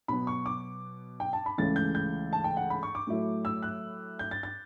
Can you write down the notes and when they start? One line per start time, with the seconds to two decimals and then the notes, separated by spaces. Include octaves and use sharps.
0.08 B2 F#3 B3 B5
0.27 C#6
0.46 D6
1.20 G5
1.33 A5
1.46 B5
1.58 C#2 C#3 E3 A3 A6
1.76 G6
1.95 G6
2.33 A5
2.44 G5
2.57 F#5
2.70 B5
2.83 C#6
2.95 D6
3.07 A2 F#3 A3 E4
3.45 E6
3.63 F#6
4.19 G6
4.31 A6
4.43 A6